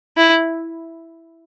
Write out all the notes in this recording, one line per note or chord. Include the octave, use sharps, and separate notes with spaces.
E4